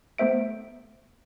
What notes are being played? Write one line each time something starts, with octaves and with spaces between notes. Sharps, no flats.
A3 B3 C5 E5 D7